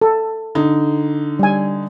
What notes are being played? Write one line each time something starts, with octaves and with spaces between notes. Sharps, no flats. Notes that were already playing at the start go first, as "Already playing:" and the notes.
A4
D3 D#4
G3 G#5